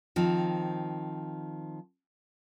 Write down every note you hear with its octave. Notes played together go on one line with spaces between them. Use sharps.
D#3 F3 C4